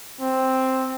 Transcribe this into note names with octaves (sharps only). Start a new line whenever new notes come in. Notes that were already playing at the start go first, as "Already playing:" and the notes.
C4